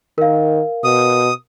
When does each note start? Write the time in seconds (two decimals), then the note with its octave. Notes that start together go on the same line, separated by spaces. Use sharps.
0.18 D#3 A#4 F5
0.84 B2 D#6